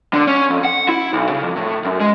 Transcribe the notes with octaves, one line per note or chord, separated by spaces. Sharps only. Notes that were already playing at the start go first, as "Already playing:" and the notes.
D3
C#4
F2
F#5
E4
B1
C#3
F2
A2
F#2
G#3